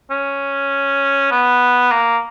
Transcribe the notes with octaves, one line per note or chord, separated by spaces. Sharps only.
C#4
B3
A#3